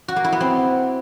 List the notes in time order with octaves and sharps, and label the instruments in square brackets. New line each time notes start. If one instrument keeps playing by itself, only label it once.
[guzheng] F#4
A#3
E4
B3
C4